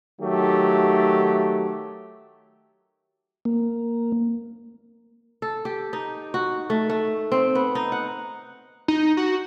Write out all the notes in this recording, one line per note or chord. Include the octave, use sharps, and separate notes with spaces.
D#3 F#3 A3 G4
A#3
A4
G4
D#4
F#4
A3
A3
C4
B3
D#4
F#5
D#4
F#4